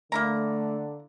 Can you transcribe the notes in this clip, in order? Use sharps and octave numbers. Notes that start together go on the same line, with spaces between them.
D3 A3 A#3 E4 A#5